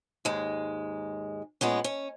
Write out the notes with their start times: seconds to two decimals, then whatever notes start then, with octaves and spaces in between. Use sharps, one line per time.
0.25 D#2 G#2 G#3
1.61 A#2 G#3 B3 C#4
1.84 C#4